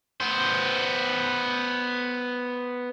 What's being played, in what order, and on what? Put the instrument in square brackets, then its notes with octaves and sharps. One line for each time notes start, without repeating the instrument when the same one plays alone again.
[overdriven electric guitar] B3 C5